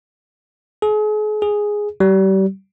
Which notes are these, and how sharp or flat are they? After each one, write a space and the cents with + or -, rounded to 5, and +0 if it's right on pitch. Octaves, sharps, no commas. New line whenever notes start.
G#4 +40
G#4 +0
G3 -35